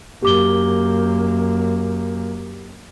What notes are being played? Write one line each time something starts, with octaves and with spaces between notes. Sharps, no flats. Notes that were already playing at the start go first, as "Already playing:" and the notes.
F#2 A#3 G4 D6 G7